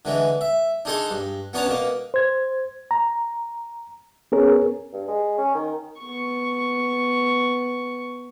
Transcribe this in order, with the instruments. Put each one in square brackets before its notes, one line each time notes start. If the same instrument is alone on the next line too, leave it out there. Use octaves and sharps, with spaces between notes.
[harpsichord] D3 E3 G#3
E5
D4 D#4 G#4 A4 G#5 C6
G2
B3 C#4 D4 C#5 A5 A#5
B2 A#3
[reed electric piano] C5 G#6
A#5
B3 C#4 G#4 A#4 C#5
[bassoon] G2
G#3
C#4
D#3
[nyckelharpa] B3 C#6